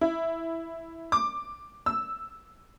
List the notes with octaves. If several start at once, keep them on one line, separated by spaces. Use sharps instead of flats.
E4
D6
E6